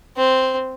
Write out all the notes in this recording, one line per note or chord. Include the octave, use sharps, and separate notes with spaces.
C4